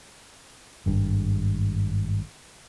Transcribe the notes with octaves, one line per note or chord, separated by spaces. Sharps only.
G#1 G2